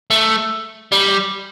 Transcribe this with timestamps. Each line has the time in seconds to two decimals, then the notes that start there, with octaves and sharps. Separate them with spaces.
0.10 A3
0.92 G3